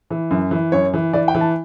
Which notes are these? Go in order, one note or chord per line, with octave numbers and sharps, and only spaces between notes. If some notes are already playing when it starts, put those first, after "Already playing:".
E3
F#2
E3
F#2 C#5
E3
E3 D5
G5
E3
A5